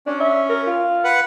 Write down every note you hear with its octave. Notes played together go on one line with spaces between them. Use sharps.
C#4 D4
E5
A#4
F4
B4 F#5